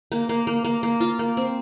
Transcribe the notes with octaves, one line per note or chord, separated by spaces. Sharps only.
A#3
A#3
A#3
A#3
A#3
F4
A#3
C4